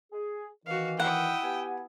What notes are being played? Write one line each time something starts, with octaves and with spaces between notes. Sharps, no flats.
G#4
D#3 E3 F#4 F5
E4 F#5 G5 D#6
B3 G4 G#5